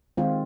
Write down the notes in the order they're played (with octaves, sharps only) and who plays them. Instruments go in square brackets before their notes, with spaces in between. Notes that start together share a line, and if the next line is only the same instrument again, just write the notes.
[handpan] D#3 G#3 C4 F4